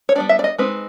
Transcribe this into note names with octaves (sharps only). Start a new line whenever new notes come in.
C#5
G3 B3 D4 D5
E5
D5
D#5
G#3 C4 D#4 B4